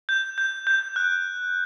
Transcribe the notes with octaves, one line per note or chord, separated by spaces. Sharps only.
G6
G6
G6
F#6